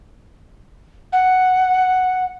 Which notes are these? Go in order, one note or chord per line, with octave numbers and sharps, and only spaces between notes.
F#5